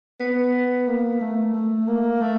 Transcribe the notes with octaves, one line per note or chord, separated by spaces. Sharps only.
B3
A#3
A3
A3
A#3
A3